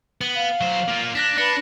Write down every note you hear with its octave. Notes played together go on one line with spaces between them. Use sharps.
B3 F#7
F5
F#3 C5
A#3 F4
D4 F#6 A#6 B6
D4 B4 A#6 C#7